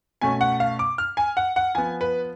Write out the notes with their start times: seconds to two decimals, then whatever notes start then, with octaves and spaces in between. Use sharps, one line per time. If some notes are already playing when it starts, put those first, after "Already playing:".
0.21 B2 A3 C#4 G#5
0.41 F#5
0.60 F5
0.79 D6
0.98 F6
1.17 G#5
1.37 F#5
1.56 F#5
1.75 F3 B3 G#5
2.01 B4